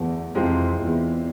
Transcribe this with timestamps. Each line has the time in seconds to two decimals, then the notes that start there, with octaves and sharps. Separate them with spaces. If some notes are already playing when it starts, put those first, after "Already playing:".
Already playing: E2 D3 F#3 A3
0.35 F2 C3 E3 G#3 C4 F4
0.78 E2